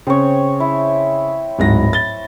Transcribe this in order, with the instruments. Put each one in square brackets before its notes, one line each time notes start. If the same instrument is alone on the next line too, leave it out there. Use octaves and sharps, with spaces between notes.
[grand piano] C#3 [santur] C4 C#5
[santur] E4
[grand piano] D1 G#2 A#6
A6 G7